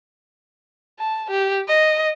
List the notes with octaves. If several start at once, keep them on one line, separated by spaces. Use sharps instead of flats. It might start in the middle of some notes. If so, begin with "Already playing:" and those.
A5
G4
D#5